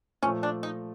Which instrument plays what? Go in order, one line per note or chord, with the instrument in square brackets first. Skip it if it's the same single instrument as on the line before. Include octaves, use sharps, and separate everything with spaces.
[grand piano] A#2 F3 A3 [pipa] C#4
[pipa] D4
D#4